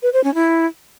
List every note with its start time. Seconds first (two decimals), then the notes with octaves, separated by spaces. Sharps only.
0.02 B4
0.13 C5
0.24 C#4
0.34 E4